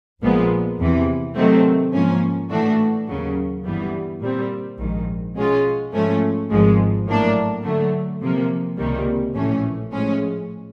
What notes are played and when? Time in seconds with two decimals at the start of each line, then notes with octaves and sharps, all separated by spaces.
0.21 A#1 A#2 F3 G#3 B3
0.79 E2 C3 E3
1.36 C3 D#3 F#3 A3 C4
1.93 G#2 F3 A#3 C#4
2.50 A2 E3 A3 D4 F#4
3.07 D#2 C#3 F#3
3.64 G1 G2 E3 G3 B3
4.21 A#2 G3 C4
4.78 A#1 G#2 D#3
5.35 B2 G#3 C#4 F4
5.92 G#2 F3 A3 C#4
6.50 G#1 G#2 F3 G#3
7.06 A2 F#3 A#3 D4
7.63 D3 F#3 A3
8.21 C3 F3 A#3
8.77 C#2 C3 D#3 G3 A#3
9.34 A#1 A2 E3 A3 C#4
9.92 A2 F3 G#3 C#4